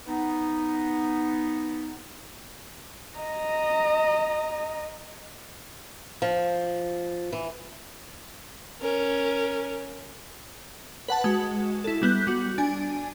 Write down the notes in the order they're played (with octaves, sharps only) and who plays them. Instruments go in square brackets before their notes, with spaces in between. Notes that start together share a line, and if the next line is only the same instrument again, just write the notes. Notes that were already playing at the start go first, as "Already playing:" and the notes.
[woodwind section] B3 D#4
[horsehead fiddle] D#5 A#5
[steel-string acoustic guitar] F3
E3
[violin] C#4 A#4
[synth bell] B4 F#5 A5
G#3 F#4
E4 A4
G3 B3 F#6 G6
G3 F#4
D4 G#5